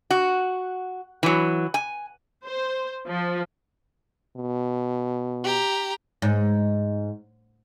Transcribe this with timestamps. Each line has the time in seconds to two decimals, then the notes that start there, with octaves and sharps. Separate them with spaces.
0.11 F#4
1.23 E3 F#3
1.74 G#5
2.44 C5
3.05 F3
4.36 B2
5.44 G4 A#5
6.22 G#2